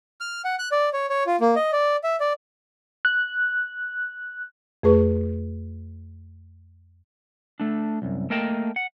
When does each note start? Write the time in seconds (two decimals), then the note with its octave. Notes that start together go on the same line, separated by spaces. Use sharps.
0.21 F6
0.45 F#5
0.59 F#6
0.72 D5
0.93 C#5
1.10 C#5
1.27 F4
1.40 A#3
1.56 D#5
1.72 D5
2.04 E5
2.20 D5
3.05 F#6
4.83 F2 A3 G#4 B4 C#6
7.60 A3 D4
8.02 C2 F#2
8.30 A3 A#3 A#4 D#5 G5 A5
8.76 F#5